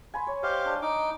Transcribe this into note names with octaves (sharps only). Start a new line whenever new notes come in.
G#5 B5 C6
C#5
G4 C5 D#5 F5
D4
D#4 D6